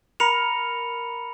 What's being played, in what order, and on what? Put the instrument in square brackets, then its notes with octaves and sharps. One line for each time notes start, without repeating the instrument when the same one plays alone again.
[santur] A#4 [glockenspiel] B5 C#7 F7